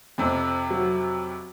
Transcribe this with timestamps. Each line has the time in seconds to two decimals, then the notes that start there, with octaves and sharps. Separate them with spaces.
0.18 F2 C3
0.70 F#3